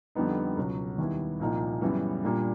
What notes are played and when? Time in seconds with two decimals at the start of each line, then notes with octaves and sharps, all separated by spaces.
0.15 F2 D3 G3 B3 D#4
0.57 C#2 B2 F#3
0.98 D#2 D#3 G3 B3 E4
1.40 C2 A#2 F3 A#3 D#4
1.81 F#2 C#3 E3 G3 B3
2.24 A#2 G3 A#3 D4